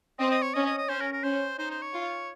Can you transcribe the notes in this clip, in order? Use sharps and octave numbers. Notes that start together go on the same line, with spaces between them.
C4 D#5
D#5
C#5
C#4 D#5
D#5
D#5
C#4 C5
A#4
A#4
C#4 C5
D#4 C5
C5
C#5
F4